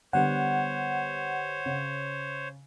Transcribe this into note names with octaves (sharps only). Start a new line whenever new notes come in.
D3 G3 B3 C5 C#5 F#5
C#3